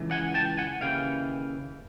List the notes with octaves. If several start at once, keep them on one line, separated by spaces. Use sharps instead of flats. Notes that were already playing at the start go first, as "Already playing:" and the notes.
Already playing: C#2 E3
F#5 G#5
G5 A5
F#5 G#5
D#2 C#3 E3 F5 G5